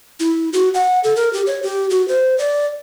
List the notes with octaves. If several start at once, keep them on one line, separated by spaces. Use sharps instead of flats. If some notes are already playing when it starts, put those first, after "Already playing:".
E4
F#4
F#5
A4
A#4
G4
C#5
G4
F#4
C5
D5